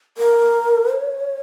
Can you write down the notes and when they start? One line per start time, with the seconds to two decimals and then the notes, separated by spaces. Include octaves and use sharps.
0.18 A#4
0.94 C#5